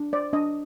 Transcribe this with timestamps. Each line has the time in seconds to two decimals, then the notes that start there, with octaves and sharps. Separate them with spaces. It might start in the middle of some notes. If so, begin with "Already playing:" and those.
Already playing: D4
0.13 C5 D5
0.33 D4 D#5